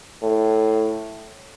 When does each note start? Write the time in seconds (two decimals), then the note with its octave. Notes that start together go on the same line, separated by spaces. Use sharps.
0.23 A2